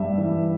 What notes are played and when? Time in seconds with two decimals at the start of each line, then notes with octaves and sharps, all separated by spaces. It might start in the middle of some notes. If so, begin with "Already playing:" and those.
Already playing: G2 G3 E5
0.18 E3